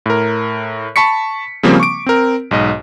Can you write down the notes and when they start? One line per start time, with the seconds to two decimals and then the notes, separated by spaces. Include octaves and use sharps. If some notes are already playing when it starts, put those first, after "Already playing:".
0.06 A2 A#4
0.96 A5 B5 C#6 B6 C#7
1.63 C#3 F3 G3 A#3 C4
1.80 C#6 D6 D7
2.06 C4 A#4
2.51 B1 G#2 D#5